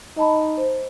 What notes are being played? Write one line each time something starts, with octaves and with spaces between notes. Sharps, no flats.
D#4 D#5 A5 B5
C5